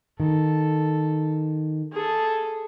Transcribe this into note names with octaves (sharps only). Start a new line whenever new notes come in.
D#3 A4
G#4 A4